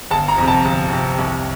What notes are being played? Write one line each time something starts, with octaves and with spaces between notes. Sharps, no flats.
G1 A5
A#5
F2 C3
A5
G1
F2 C3
C2